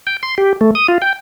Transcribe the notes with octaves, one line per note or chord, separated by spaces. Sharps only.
G5
C6
G4
A3
D#6
F4
G5